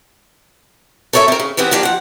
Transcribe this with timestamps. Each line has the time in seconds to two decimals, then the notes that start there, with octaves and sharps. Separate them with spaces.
1.13 A4 A#4 C#5 D#5 E5
1.28 C4 A#4
1.40 C#3
1.57 C3 E3 B3 C4 B4
1.71 F3 A#3 D4 G4 D5
1.83 F3 F#5